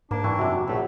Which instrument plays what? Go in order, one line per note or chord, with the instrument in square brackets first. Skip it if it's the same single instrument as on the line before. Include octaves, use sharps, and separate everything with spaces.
[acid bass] G#2 [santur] A#3 [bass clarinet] D4
[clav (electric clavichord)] G2 E3 [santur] C#6
[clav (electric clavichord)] F#2 C3 [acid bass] F#4
[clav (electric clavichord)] A#1 A2 [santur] F#3 [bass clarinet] A3